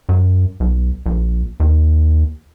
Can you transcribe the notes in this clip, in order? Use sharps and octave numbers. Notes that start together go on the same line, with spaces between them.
F#2
B1
A#1
D#2